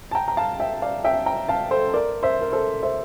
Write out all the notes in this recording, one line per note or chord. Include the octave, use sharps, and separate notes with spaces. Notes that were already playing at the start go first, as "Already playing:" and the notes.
A5
G5 A#5
A#5
F5 A5
E5 G5
D5 F5
E5 G5
G5 A#5
F5 A5
A4 C5
A#4 D5
C5 E5
A#4
A4 C5
C5 E5